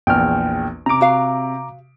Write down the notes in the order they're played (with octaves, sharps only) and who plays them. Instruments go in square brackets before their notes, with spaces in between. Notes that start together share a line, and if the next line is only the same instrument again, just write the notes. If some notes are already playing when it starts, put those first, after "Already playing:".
[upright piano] A#1 E2 [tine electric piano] G5 F6
[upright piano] C3 D7 [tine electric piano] A#5 D6
[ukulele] F#4 F5